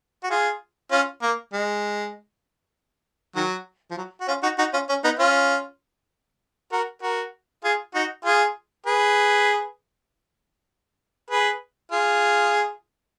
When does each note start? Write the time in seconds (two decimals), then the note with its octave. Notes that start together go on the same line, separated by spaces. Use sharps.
0.23 F#4
0.31 F4 G#4
0.91 C#4 F4
1.22 A#3
1.53 G#3
3.36 D#3 F#3
3.91 F3
3.98 F#3
4.21 F#4
4.28 C#4 F4
4.43 D#4 F#4
4.58 D#4 F#4
4.73 C#4 F4
4.89 C#4
5.04 B3 D#4
5.19 C#4 F4
6.72 F#4 A#4
7.02 F#4 A#4
7.64 F4 G#4
7.95 D#4 F#4
8.25 F4 G#4
8.86 G#4 B4
11.30 G#4 B4
11.92 F4 G#4